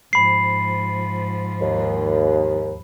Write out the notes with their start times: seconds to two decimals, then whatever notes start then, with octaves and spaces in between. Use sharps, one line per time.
0.13 G#2 F3 B5 C7
1.62 D#2